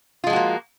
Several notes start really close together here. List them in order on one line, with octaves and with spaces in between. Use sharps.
F4 G#3 F3 F#4 A#3